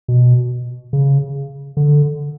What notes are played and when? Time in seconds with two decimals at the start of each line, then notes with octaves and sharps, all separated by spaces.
0.08 B2
0.93 C#3
1.77 D3